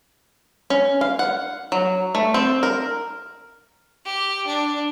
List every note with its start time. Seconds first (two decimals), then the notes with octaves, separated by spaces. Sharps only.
0.70 C#4
1.01 F5
1.19 F#5
1.72 F#3
2.15 A3
2.34 C4
2.63 A#4
4.05 G4
4.46 D4